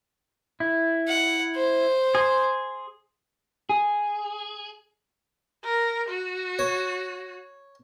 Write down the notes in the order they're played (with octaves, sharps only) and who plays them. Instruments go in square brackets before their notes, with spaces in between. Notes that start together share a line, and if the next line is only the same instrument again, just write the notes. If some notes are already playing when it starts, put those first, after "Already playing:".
[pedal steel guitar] E4
[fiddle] F#5
C5
[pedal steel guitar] G#4 C6
[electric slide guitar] G#4
[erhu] A#4
F#4
[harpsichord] C#5